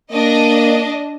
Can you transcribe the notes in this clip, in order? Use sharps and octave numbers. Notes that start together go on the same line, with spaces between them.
A#3 D4 D#5